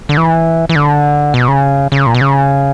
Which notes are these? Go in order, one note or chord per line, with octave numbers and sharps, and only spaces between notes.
D3
E3
E3
D3
B2
C#3
C#3
A#2
B2
C#3